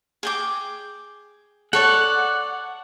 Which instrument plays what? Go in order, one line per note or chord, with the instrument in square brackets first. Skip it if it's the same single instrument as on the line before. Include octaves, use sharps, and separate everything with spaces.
[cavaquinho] G#4 G5 D6
[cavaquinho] A4 C#5 D5 [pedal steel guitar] F#5